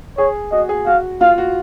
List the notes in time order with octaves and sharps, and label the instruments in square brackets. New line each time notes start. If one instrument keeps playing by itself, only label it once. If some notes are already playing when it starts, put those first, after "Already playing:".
[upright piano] G#4 [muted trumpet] C#5
[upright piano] F#4 [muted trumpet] D#5
[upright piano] G#4
[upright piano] F#4 [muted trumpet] F5
[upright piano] F4 [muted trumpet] F5
[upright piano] F#4